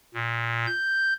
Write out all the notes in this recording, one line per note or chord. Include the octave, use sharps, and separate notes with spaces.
A#2
G6